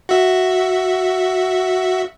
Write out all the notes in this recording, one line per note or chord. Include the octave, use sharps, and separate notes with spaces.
F#4 E5